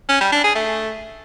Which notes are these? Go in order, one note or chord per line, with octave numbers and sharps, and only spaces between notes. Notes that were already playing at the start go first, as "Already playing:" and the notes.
C#4
G3
D4
G#4
A3